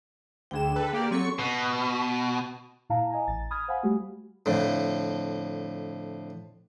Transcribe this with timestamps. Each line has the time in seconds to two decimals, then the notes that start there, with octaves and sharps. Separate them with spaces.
0.51 D2 D3 G#4 G5 E7
0.76 D3 A4 B4
0.93 A#3 G4 D5
1.11 F#3 C4 A4 C#6 C#7
1.39 B2
2.90 A#2 E4 F5 A5 A#5
3.10 D#5 G#5 A#5
3.27 A1 A6
3.50 B5 D#6 F6 G#6
3.68 C5 F5 F#5 G#5 B5
3.83 G3 A3 F#4 G4
4.46 F2 A2 D3